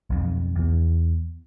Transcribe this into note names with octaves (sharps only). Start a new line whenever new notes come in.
B1 F2
E2